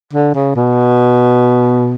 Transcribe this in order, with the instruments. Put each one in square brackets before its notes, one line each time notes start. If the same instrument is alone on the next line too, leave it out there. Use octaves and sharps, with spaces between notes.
[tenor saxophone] D3
C#3
B2